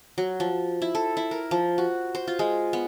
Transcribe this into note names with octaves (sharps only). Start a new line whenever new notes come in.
F#3
F3
E4
A4
E4
A#4
F3
F#4
C5
F4
G#3
B3